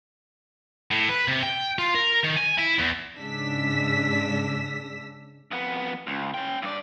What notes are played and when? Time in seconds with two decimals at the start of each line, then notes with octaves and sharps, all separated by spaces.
0.91 A2
1.09 B4
1.28 C3
1.43 G5
1.78 F4
1.95 A#4
2.24 D#3
2.36 G#5
2.58 E4
2.78 E2
3.17 G#2 C#3 G#3 D4 E6 B6
5.51 F2 B3
6.07 C#2
6.34 C#4 G5
6.62 G2 D5